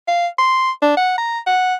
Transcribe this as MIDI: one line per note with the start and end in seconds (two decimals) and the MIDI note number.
0.08 0.27 77
0.38 0.71 84
0.82 0.95 62
0.97 1.14 78
1.18 1.39 82
1.47 1.75 78